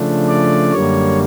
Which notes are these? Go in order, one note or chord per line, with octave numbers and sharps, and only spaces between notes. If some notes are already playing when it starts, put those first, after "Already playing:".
Already playing: C#3 F3 A3 D4
D5
F#2 D3 G3 A#3 C#5